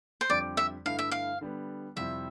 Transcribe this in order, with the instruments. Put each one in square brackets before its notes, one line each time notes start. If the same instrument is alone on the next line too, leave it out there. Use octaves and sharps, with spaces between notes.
[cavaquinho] C5
[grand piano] F2 D3 G3 C4 [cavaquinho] D5
[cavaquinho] E5
[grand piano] G2 D3 A3 E4 [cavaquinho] F5
[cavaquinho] E5
F5
[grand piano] D3 G3 B3
[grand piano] F2 C3 G3 C4 E4 [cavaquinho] E5